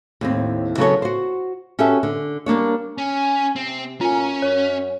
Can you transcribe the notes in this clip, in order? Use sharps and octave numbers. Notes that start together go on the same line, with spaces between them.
D#2 A2 C4
C#3 F#3 B3 F#4 A4 C#5
F#4 C5
C#4 F#4 G4 A4 B4 E5
D3
G3 A#3 D4 C#5
C#4 G#5
C3 C4
A2 A#3 C#4 F4 A#4 G#5
F#2 C#5